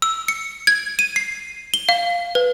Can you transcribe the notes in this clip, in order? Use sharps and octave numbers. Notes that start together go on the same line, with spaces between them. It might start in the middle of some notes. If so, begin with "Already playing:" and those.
E6
C#7
G#6
D#7
C7
G7
F5
B4